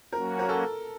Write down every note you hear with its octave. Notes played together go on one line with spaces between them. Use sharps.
F#3 A#3 C#4 F#4 A#4
A#4
A4